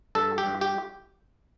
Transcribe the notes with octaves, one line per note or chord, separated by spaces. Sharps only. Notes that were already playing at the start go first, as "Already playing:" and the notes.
G2 A4
G4
G2
G4